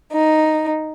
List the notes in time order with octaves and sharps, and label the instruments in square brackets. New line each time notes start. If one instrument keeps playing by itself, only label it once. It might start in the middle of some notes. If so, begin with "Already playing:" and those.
[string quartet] D#4